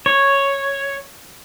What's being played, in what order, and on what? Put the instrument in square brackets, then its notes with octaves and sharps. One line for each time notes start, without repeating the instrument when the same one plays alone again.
[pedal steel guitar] C#5